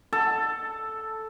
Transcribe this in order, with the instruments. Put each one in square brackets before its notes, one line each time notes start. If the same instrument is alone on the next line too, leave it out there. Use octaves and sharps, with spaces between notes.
[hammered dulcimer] A4